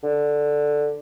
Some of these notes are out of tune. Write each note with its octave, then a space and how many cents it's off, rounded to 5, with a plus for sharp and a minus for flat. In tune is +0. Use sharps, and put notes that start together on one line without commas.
D3 +5